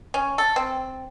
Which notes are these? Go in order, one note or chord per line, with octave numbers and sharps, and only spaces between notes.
C#4
A4
C4